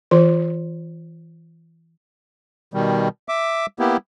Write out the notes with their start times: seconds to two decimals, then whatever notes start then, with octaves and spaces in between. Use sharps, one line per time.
0.11 E3 F4 C5 C6
2.74 B2 D#3 G3
3.29 E5 D6
3.79 A#3 B3 E4 G4